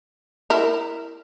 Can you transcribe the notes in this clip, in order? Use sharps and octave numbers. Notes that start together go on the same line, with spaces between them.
E4 A#4